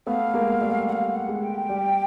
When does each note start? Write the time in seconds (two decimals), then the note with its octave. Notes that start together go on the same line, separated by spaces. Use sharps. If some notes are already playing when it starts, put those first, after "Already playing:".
0.07 A3 B3 F5
0.34 G#3 A#3
0.61 G3 A3
0.88 G3 F5 F#5
1.15 F#5
1.29 G#3
1.42 G5
1.69 G3